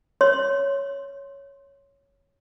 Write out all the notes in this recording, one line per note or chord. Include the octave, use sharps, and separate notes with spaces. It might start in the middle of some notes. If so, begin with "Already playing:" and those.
C#5 C6